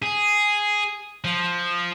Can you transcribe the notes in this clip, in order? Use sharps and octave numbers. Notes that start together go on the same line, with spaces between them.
G#4
F3